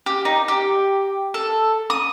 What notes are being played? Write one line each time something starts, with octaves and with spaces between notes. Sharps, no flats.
G4
D#4
G4
A4
D#6